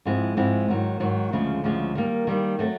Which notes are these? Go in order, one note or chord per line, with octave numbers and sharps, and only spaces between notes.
G#2 F3 G#3 C4 E4
G#2 F3 G#3 C4 E4
G#2 D#3 F#3
G#2 D#3 F#3
D2 C#3 F3 G#3
D2 C#3 F3 G#3
D#3 G3 A#3
D#3 G3 A#3
F#3 A3 C4